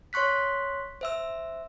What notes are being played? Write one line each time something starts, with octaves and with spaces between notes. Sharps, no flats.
C#5 C6 C#6 F#6 B6
C5 E5 E6